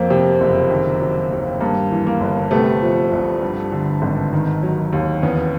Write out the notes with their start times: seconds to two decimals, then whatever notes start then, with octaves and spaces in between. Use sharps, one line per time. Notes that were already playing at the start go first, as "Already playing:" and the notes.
Already playing: F2 A#3 C4
0.10 C3
0.41 F#1
0.70 D#3
1.00 F#3
1.31 D#2
1.61 G2 A#3
1.91 E3
2.07 A#3
2.21 G1
2.51 C3 A3 B3
2.82 F3
3.12 C2
3.42 G2
3.72 D3
4.02 G#1
4.33 D#3
4.63 F#3
4.93 D#2
5.22 E2 B3 C#4